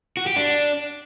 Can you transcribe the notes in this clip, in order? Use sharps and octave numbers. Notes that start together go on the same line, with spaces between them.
F#4
G4
D4